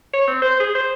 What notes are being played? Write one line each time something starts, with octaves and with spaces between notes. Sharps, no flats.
C#5
C4
C5
G#4
C5